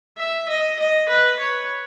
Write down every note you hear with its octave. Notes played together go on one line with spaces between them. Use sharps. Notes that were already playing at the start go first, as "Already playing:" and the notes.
E5
D#5
D#5
B4
C#5